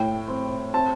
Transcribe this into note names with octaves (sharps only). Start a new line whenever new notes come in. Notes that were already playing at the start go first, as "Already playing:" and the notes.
Already playing: A2 G5
C4
C4 A5